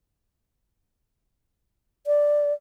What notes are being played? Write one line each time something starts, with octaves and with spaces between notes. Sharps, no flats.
D5